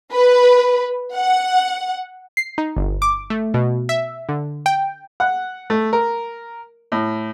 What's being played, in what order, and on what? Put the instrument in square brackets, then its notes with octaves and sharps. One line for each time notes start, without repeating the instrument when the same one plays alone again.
[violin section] B4
F#5
[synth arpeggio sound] C7
D#4
G1
D6
A3
B2
E5
D3
G5
[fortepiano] F#5
A3
A#4
A2